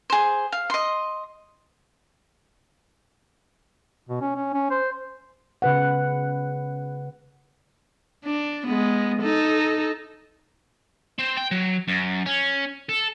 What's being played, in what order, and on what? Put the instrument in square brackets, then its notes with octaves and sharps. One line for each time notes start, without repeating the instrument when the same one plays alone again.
[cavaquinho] G#4 C5
F5
D#5 C6
[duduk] B2
C#4
C#4
C#4
C5
[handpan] C#3 B4 F#5
[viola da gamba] D4
G#3 B3
D#4 A4
[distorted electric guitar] C4
G5
F#3
F#2
C#4
A4